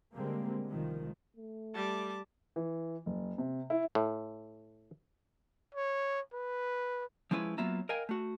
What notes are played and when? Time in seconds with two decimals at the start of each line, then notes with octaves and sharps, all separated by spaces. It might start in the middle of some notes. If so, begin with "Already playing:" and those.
0.15 D3 G3 G#3 A#3 C4
0.69 C2 D#3 F3 G#3
1.36 A3
1.74 G3 A5 D6
2.56 E3
3.06 F#1
3.38 C3
3.70 E4
3.95 A2
5.75 C#5
6.33 B4
7.31 F3 G#3 C#4 E4 B4
7.58 F#3 A#3 B3 F4 E5 A#5
7.89 A#4 D#5 F5 G5 G#5
8.09 A3 F#4